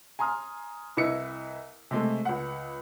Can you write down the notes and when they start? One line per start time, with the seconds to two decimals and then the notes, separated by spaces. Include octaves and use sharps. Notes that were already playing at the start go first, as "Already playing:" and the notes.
0.19 G#5 A#5 C6 D#6 F6
0.97 C2 E4 B4 D#5 C#7
1.91 C3 G#3 A3
2.25 C#2 F#5